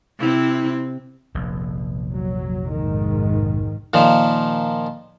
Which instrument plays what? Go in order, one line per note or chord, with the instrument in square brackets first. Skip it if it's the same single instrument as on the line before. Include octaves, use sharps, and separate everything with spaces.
[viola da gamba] C3 C4 [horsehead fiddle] E4
[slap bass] F1 A#1 F2
[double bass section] F#3
G#2 D#3
[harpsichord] A#2 D#3 F3